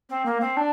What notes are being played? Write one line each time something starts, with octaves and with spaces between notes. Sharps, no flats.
C4
A#3
C4
D4